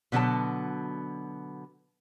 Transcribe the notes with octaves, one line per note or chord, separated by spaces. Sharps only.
B2 D3 F#3 B3 A5